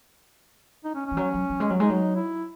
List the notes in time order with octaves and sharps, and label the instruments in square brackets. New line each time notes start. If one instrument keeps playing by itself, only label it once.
[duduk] D#4
C#4
C#4
[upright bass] E3
F#3
F#3
F#3
G#3
F#3
[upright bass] G#3 [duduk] D#4
[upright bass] F#3
[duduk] E4